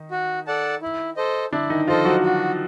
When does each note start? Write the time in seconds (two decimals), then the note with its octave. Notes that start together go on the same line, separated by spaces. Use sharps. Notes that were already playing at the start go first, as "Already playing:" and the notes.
Already playing: D#3 D#4
0.11 F#4
0.47 A4 D5 F#5 A5
0.82 E4
1.17 A4 C5 D#5
1.52 D3 D4 E4
1.70 D#3 D#4
1.87 F3 F4 A4 C5 D#5
2.05 F#3 F#4
2.23 F#4